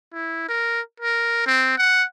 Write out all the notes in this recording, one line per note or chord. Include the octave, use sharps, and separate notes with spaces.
E4
A#4
A#4
C4
F#5